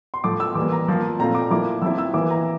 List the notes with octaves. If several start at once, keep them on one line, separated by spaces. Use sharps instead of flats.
C6
A2 F3 A3 D6
E6
E3 G3 A#3 D6
A#5
F3 A#3 F4
A#2 A3 C4 F4 A#5
D6
F3 A#3 E4 D6
F3 C4 E4 E6
E6
E3 A#3 E4 D6
A#5